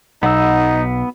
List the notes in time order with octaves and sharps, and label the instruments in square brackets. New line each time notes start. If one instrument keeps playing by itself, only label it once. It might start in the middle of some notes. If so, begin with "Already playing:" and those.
[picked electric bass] B1 [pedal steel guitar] B3 F#5 E6 [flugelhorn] D#4